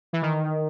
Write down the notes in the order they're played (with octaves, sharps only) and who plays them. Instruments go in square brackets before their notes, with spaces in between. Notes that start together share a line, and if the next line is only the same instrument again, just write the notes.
[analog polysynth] E3
D#3